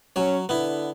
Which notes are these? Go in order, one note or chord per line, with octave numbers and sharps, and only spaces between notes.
F#3 C#4 C#5
D3 B3 E4